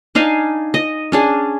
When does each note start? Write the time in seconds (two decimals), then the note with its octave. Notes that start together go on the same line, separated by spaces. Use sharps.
0.15 D4 D#4 F5 G#5
0.74 D#5
1.12 C#4 D4 G#4